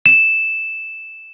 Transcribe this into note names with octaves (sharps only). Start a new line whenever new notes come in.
E7